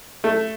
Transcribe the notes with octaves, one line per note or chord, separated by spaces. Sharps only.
A3